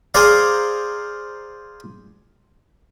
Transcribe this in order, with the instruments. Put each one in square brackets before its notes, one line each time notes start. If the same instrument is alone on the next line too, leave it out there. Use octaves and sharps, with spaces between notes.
[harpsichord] G#4 C5 D5 F5 A#5